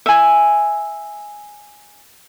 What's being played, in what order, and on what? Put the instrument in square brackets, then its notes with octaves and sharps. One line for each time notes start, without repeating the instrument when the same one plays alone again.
[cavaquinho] E5 G#5